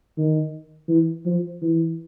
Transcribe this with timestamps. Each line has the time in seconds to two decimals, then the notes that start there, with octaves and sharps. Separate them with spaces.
0.17 D#3
0.88 E3
1.26 F3
1.62 E3